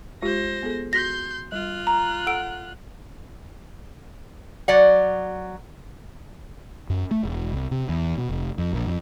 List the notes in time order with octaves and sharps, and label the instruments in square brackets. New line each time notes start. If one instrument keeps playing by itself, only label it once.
[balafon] G#3 F4 G4 [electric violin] C5 A#6
[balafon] B3 G#4 A4
[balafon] F#4 [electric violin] C6 G6 [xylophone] A#6 B6
[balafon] G3 [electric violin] F4 F#6
[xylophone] A#5
[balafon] A4 A#5 [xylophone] F#5 E6 D7
[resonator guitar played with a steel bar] F#3 D5 F#5
[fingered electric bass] F#2
A3
E1
C2
C3
E2
B2
F1
F2
A#1
F2